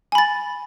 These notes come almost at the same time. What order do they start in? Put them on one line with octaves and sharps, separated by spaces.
G#5 B5 A6